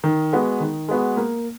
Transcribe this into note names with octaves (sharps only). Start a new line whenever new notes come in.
D#3
G#3 B3 F#4
D#3
G#3 B3 F#4
A#3